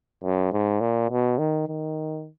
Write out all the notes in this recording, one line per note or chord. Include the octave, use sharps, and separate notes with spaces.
F#2
G#2
A#2
B2
D#3
D#3